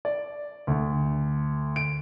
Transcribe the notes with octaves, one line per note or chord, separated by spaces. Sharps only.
D5
D2
D7